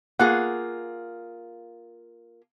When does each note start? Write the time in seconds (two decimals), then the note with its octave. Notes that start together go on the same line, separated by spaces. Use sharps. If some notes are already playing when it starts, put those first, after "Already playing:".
0.19 A#3 F4 G#4 F#5